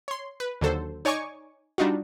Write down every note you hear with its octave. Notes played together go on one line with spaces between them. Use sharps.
C#5 C6
B4
D#2 D3 F#3 A4 C5
D#4 C#5 D5 G#5 C#6 D6
G3 D4 D#4 F4 F#4